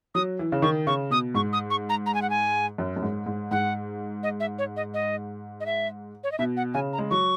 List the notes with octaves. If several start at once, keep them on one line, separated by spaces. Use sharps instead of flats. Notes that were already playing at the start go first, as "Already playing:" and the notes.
F#3 D#6
E3
C#3
D#3 C#6
C#3 C#6
B2 D#6
G#2 C#6
D#6
C#6
A#5
A#5
G#5
F#5
G#5
F#2
F#2
G#2
G#2
G#2 F#5
D#5
E5
C#5
D#5
D#5
D#5
E5
C#5
D#5
B2 E5
F#5
C#3 G#5
A#5
G#3
F#3 C#6